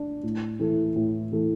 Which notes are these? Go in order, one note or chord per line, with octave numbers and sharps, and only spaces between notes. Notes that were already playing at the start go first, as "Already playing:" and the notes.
Already playing: D4
A2
E3 A3
A2
E3 A3